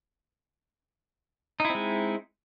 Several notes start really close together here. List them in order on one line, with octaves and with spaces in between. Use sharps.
D#4 E4 C4 G#3